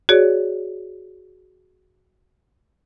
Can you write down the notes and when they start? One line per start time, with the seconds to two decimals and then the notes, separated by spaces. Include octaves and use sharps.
0.09 F#4 G#4 C#5 D5